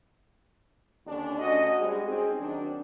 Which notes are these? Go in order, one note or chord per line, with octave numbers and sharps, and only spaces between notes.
D#2 D3 C#4 D4
D2 C#4 F#4 D#5
G3 G#3 C4 D4 F#4 G#4
C4 C#4 D#4 G#4
D#3 F#3 C4 D4